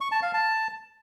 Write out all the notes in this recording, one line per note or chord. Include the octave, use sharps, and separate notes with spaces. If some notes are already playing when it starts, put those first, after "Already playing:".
C#6
A5
F5
A5